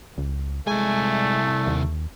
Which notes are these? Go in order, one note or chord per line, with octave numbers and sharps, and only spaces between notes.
C#2
C2 G#3 A3 G#5
D#2